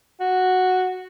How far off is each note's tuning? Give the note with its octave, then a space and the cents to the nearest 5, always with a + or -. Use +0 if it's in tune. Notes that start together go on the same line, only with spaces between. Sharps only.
F#4 -5